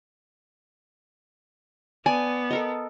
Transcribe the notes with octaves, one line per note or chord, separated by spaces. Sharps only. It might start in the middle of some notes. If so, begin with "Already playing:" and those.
B3 D5 G#5
A4 A#4 D#5